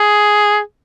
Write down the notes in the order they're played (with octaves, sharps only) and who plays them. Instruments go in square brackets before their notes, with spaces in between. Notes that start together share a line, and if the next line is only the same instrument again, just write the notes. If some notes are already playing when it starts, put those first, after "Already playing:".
Already playing: [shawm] G#4